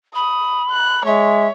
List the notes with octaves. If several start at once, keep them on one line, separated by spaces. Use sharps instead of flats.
B5 D#6
F#6
G#3 C#5 E5